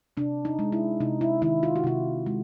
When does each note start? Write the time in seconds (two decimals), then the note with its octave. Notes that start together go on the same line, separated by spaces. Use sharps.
0.17 C3 D4
0.45 D#4
0.59 G#3
0.72 E4
1.00 C3 D#4
1.21 E4
1.42 D#3 E4
1.63 F4
1.76 F#4
1.84 C3 F4
2.26 G#3